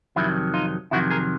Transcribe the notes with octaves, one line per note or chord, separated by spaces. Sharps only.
F2 C3 D#3 F#3 E4
D#4 F4
F2 C3 D#3 F#3 E4 F#4
G#4 A#4